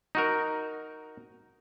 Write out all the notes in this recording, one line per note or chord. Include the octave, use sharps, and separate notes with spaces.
D#4 F#4 A#4